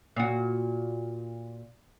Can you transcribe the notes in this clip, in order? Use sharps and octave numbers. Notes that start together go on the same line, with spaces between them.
A#2 F#4